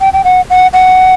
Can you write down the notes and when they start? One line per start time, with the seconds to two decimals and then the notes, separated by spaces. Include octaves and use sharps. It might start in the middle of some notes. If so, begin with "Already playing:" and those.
0.01 G5
0.13 G5
0.24 F#5
0.50 F#5
0.73 F#5